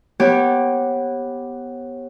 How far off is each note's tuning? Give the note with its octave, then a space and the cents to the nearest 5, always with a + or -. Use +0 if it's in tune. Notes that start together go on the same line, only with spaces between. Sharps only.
B3 +0 G4 +0 C#5 -30